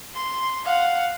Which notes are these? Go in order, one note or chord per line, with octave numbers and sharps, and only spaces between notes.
C6
F5 F#5